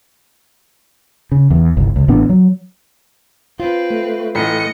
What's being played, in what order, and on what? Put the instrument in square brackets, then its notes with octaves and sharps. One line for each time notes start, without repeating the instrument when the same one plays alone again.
[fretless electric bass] C#3
E2
G1 C2
C#2
A1 A2 B3 D4
F#3
[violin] C4 B4 [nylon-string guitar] F4
[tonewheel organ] A3
[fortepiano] A1 [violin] D#5 C#7